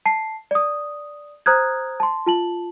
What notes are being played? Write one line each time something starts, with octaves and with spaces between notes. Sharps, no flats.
A5 C7
D5 D#6
C5 A#5 D#6 F6 F#6 G#6
A5 C6
F4 A5 F#7